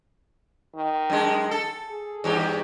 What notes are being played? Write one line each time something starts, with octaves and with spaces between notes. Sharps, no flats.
D#3
F#2 G#3
A4
G#4
E2 G2 G4